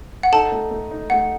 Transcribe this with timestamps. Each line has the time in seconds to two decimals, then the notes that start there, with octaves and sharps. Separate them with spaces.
0.23 F#5
0.32 D#4 A4 A5
0.52 A3
0.71 A3
0.91 D#4
1.10 A3 F#5